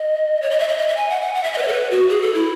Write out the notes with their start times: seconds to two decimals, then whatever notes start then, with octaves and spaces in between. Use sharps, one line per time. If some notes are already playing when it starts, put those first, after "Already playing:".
Already playing: D#5
0.42 C#5
0.51 D#5
0.59 E5
0.68 D#5
0.79 D#5
0.88 E5
0.97 G#5
1.10 F#5
1.22 F#5
1.35 F#5
1.43 E5
1.53 D#5
1.58 B4
1.62 C#5
1.68 A4
1.73 B4
1.91 F#4
2.10 G#4
2.22 A4
2.34 E4